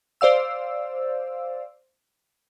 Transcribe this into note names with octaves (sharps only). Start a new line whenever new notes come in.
C5 D5 F5 E6